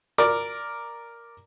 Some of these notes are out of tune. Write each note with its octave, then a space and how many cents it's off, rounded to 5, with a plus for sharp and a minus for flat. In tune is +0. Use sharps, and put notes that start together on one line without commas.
A#4 +0 D5 +0